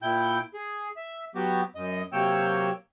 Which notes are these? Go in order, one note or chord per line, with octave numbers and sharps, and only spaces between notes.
A#2 E4 G5 G6
G#4
E5
F#3 B3 F#4 G4
F#2 D#5
C3 F#3 A#3 C#5 G5 E6